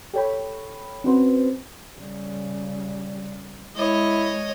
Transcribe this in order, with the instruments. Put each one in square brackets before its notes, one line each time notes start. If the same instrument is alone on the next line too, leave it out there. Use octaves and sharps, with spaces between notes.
[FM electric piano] G4 A4 C#5 G5 B5
C4 C#4 F#4 B4 C5
[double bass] C#3 G3
[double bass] G#3 [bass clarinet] E4 [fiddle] C#5 D#5